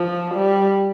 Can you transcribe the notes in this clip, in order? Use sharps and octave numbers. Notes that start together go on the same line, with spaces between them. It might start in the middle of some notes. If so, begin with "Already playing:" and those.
Already playing: F3
G3